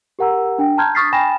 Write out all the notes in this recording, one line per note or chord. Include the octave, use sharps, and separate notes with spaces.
G4 A#4 F#5 A#5 E6
D4 G5
A5 A#5 C6 F6 G6 G#6
C#6 D#6 F6 A6 B6 C7
G5 G#5 B5 A#6 E7